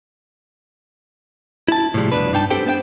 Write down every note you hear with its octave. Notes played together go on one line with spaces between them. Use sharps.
E4 A5
A2 C3 F3 G3 G#3
C2 F2 B2 D4 B4
G2 D4 D#4 G5 A5
C4 D4 G4 A4 C5 G5
B3 D4 C5 F5 G5